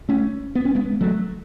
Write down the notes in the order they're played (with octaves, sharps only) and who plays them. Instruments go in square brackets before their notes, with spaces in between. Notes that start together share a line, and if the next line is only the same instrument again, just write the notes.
[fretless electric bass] A3 C#4
B3
C#4
G#3 B3
F#3 A3